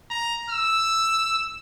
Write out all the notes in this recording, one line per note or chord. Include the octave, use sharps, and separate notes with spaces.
A#5
E6